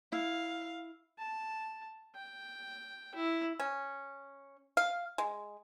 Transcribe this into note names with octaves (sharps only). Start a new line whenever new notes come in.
E4 F5
A5
G5
E4
C#4
F5
G#3